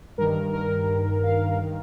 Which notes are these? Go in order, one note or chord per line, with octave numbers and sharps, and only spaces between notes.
G2 D#3 A#4
A#4
F5
D#3